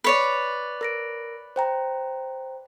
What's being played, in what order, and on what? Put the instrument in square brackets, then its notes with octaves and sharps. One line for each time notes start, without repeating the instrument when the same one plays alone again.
[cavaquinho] B4 C#5 D5
[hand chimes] A#4 A#6 D7
C5 G5 A#5